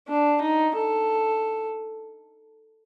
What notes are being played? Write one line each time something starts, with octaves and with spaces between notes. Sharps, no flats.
D4
D#4
A4